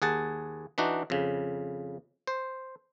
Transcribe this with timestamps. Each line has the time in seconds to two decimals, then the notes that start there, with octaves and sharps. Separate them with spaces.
0.02 D#2 G#4 F#5 A5
0.78 E3 D4 D#4 F#4
1.10 F2 C#3
2.27 C5